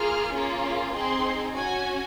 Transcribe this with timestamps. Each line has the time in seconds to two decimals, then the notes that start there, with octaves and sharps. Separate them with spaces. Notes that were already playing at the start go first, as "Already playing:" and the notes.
Already playing: A#3 F4 G#4 F6
0.31 A#3 C#4 F4 G#4
0.94 C4 D#4 G#4 C6
1.55 C#4 F#4 G#5